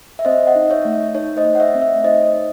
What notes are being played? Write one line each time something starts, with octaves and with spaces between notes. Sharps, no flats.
E5
C4 C5 D#5
D#5 F#5
D#4
C#5 E5
A3
C#5
D#4 C#5
C5 D#5
A3
F#5
C#5 E5
C4
C#5 E5
D#4 C5 D#5
D#4